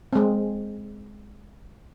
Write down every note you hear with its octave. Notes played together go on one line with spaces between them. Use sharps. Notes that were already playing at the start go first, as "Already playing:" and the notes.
G#3 C4